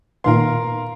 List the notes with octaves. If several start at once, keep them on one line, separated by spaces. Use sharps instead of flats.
A#2 D#3 B3 A#4 F5 C6